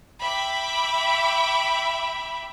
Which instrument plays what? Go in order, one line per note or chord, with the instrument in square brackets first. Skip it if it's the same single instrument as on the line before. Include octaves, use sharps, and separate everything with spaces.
[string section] E5 G5 B5 D6